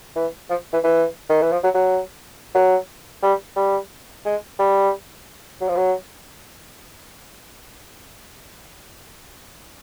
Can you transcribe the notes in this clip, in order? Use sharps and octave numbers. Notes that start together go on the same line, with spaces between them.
E3
F3
E3
E3
D#3
E3
F3
F#3
F#3
F#3
G3
G3
G#3
G3
F#3
F3
F#3